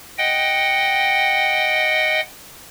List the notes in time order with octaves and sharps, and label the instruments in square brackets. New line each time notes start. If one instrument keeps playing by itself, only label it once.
[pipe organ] D#5 F#5 G5